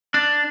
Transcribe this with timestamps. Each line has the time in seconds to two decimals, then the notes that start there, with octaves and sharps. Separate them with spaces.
0.14 D4